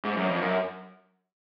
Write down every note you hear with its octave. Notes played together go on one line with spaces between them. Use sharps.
G#2
F#2
F2
F#2